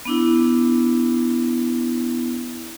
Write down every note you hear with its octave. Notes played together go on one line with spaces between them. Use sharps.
B3 D4 E4